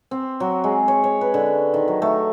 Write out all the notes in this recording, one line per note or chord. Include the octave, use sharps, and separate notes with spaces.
C4
F#3
G#3
C#5
C#5
B4
D3
D#3
F#3
A3